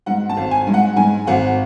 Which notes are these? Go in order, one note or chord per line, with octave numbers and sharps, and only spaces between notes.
G#2 F#5
A5
G#1
G#5
G#2
F#5
G#2 G#5
G#1 F#5